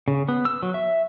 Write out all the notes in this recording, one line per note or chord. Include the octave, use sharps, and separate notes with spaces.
C#3
B3
E6
F#3
E5